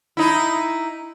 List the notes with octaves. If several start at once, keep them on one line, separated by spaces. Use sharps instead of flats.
D#4 E4